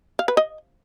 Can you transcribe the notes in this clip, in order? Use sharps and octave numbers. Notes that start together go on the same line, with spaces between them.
F5
B4
D#5